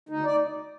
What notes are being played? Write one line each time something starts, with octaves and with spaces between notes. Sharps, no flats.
D2 D#4
D5